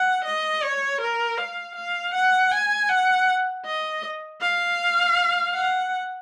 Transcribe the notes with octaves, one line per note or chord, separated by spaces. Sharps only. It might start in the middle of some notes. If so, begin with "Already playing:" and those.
Already playing: F#5
D#5
C#5
A#4
F5
F5
F#5
G#5
F#5
D#5
F5
F#5